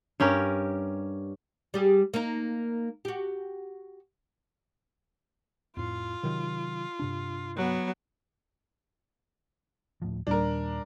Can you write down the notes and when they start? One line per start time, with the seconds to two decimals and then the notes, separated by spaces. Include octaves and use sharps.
0.20 G2 C#4 G4 A#4
1.74 G3 G4 G#4
2.14 A#3 D#4
3.05 F#4 G4
5.77 F2 A2 F4
6.23 C3 D#3 F#3
6.99 G2 C3 D4
7.56 F#3 B3
10.02 D1 A2 F3
10.27 D#2 A#2 D#3 G3 D4 A#4